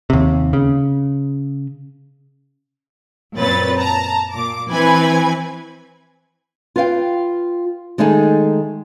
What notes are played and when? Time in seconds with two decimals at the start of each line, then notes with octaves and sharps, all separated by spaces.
0.10 D#2 C3
0.53 C#3
3.36 F#2 A#2 C4 B4 C#5 A6
3.78 A5 A#5
4.32 A#2 D6
4.69 E3 C4 B4 G#5 G#6
6.76 F4 B4 F5 G5
7.98 D#3 G#3 A3 D#4 G#4 A4